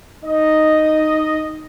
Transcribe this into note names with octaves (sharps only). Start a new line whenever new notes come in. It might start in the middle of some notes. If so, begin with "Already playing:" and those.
D#4 D#5